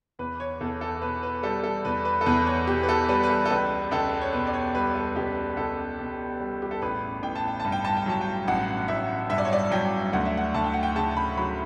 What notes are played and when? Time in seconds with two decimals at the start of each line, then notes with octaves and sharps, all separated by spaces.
0.19 E2 B4
0.40 C#5
0.61 E2 A4
0.81 A4
1.02 B2 B4
1.23 B4
1.43 G3 A4
1.63 A4
1.85 E2 B4
2.05 B4
2.21 A4
2.26 E2 B4
2.47 C#5
2.67 B2 G4
2.83 B4
2.89 A4
3.08 G3 B4
3.23 B4
3.30 A4
3.46 A4
3.50 C#2 B4
3.91 C#2 A4
4.22 C#5
4.33 B2 B4
4.47 D5
4.54 C#5
4.74 G3 B4
4.95 A4
5.16 C#2 G4
5.57 C#2 A4
5.99 B2
6.40 G3
6.62 G4
6.71 A4
6.82 A1 B4
7.23 A1 G5
7.35 A5
7.48 G5
7.60 G2 A5
7.72 G5
7.84 A5
7.97 G5
8.06 F#3 A5
8.21 G5
8.48 A1 F#5
8.88 A1 E5
9.30 G2 E5
9.38 D5
9.45 C#5
9.53 D5
9.71 F#3 G5
10.13 D2 F#5
10.25 E5
10.37 F#5
10.54 D2 A5
10.64 G5
10.74 F#5
10.83 G5
10.95 C#3 A5
11.11 A5
11.17 B5
11.37 F#3 B5